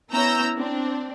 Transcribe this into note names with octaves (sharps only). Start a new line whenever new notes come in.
B3 C#4 E4 A#5 E6 G6
C4 D4